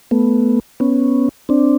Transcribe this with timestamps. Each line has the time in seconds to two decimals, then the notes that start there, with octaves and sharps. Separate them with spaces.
0.11 A3 B3
0.80 B3 C#4
1.49 C4 D4